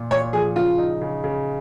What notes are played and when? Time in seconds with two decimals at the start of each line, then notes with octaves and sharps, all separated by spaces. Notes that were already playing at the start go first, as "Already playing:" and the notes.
Already playing: A#2 F4
0.11 A#2 C#5
0.33 F3 G#4
0.56 C#3 F4
0.78 D#4
1.01 C#3
1.24 C#3